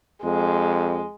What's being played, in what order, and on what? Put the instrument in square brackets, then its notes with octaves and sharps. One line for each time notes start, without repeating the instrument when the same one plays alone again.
[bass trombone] F2 [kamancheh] G#3